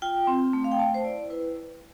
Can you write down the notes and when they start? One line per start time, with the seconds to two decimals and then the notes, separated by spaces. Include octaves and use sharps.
0.02 F4 G5
0.27 C4
0.53 A3
0.64 F5
0.71 G5
0.79 A3 A5
0.94 C5
1.04 E4 D5
1.30 E4 B4